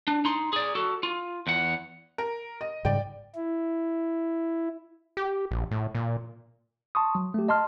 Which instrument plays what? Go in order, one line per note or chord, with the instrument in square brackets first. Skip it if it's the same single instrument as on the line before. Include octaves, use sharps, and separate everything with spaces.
[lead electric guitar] D4
D#4 C6
G#4 D5
F#4 A4
F4
E2 F#5
[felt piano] A#4
D#5
[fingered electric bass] G#2 C#3 G3 [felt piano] D5 G5
[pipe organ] E4
[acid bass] G4
A#1
A2
A#2
[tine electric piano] A5 C6 C#6 D#6
F#3
A3 G4
D#5 A5 C6 F6